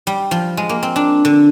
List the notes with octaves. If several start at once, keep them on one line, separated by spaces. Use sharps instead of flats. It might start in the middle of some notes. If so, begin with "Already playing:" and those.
G3
F3
G#3
A#3
C4
D4
D3